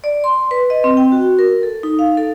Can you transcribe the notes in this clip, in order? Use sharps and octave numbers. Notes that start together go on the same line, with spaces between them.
D5
C6
B4
D#5
C4
G5
F#4
A#4
A4
D#4
F5
A4